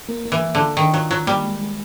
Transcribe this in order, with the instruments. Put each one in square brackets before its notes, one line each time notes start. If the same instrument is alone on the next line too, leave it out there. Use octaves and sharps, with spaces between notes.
[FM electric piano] A#3
A#3
[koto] E3
[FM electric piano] A#3
[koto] D3 [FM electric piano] F4
[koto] D#3 [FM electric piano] D4
[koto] F#3 [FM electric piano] F4
[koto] F#3 [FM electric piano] F4
[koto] G3 [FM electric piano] A#3
[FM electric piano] G#3
G#3